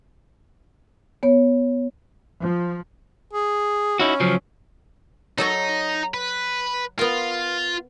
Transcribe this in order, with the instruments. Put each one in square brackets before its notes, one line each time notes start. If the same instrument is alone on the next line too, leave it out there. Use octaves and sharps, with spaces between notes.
[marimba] B3 C#5
[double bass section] F3
[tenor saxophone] G#4
[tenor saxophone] C#4 [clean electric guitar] D#4 E4 F#4
[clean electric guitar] C#3 F3 F#3
[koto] F#3 A4 C#5 [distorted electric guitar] D#4
[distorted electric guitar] B4
[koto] B3 A#4 [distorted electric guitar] F4